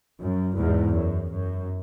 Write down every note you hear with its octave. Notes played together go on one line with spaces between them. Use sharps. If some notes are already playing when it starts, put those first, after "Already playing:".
F#2
E2 G#2
F#2
F#2